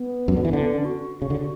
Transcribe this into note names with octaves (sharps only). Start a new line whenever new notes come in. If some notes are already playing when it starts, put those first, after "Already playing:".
Already playing: B3
F#2
D3
E3
D3
B3
C#4
F#4
C#3
D3